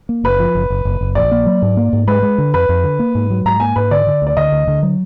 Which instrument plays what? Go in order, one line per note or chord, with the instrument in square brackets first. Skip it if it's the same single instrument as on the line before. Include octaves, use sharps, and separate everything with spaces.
[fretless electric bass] A#3
[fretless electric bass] F#1 [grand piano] B4
[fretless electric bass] F3
F#1
F#1
F#1
F#1
[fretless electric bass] A#1 [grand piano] D5
[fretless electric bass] A#3
F#3
G#2
A#3
G#2
[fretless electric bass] G#3 [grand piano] B4
[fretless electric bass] G#3
D3
[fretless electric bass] F2 [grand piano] B4
[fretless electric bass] F2
D3
A#3
G#2
F#3
[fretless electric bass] G#2 [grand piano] A#5
[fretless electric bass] A#3 [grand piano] G#5
[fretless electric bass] G#2 [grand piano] B4
[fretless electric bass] D3 [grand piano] D5
[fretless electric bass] D3
[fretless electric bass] D2 [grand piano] D5
[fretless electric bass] D3 [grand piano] D#5
[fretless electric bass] D2
D3
F#3